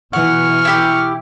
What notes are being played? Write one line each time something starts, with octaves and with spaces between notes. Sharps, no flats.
B2 E3 F#5 C#6 F6
E4 G4